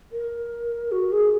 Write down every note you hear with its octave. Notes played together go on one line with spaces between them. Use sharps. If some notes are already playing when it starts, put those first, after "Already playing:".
A#4
F#4
G#4